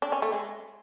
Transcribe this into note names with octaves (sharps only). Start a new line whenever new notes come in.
D4
C#4
A3
G#3